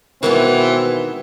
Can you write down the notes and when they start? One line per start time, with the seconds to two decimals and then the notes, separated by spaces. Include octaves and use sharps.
0.23 B2 D#3 E3 G#3 B3 C4